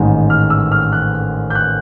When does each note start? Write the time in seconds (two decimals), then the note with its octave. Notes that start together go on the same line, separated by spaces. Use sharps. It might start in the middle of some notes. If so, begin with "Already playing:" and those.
Already playing: A1 G#2 D#3 G#3
0.30 F6
0.50 E6
0.72 F6
0.92 F#6
1.50 G6
1.55 F#6